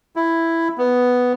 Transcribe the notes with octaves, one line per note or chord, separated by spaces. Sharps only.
E4
B3